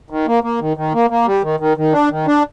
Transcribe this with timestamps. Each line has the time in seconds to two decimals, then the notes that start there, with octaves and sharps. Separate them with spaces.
0.10 D#3
0.27 A#3
0.44 A#3
0.61 D#3
0.77 D#3
0.94 A#3
1.10 A#3
1.26 G3
1.43 D#3
1.60 D#3
1.77 D#3
1.93 D4
2.10 D#3
2.27 D4